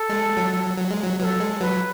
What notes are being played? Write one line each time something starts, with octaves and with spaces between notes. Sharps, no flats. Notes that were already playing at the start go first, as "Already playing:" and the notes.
Already playing: A4
G#3
F#3
F#3
G#3
F#3
F#3 A4 B4
G#3
F#3 B4